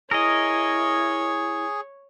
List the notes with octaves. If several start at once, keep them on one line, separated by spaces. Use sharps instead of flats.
E4 G#4 A#4 C#5 D#5